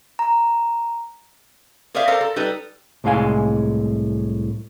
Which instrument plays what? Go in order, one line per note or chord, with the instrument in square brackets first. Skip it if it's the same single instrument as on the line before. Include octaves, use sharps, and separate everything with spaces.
[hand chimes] A#5
[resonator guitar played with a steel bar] G#4 A#4 C5 D5 E5 F5
A4 A#4 C5 D5 F5 A#5
A4
G3 D#4 A4 B4
[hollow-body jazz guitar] C2 A2 G#3 F5 G#5